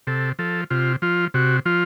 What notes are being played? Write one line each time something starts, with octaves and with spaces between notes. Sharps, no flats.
C3 A4
F3 A4
C3 F4
F3 F4
C3 F#4
F3 F4